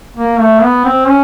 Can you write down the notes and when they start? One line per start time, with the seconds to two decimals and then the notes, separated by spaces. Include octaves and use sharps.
0.17 A#3
0.39 A3
0.62 B3
0.85 C4
1.07 C#4